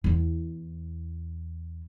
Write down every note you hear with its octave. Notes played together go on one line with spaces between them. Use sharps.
E2 E4